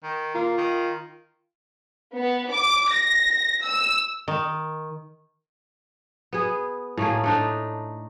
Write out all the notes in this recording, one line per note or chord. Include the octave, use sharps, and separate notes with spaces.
D#3
A#3 F4
D#3
B3
D6
A#6
E6
D#3
B3 G#4
A2 A3 A#3 G#4
A3 D4 D#4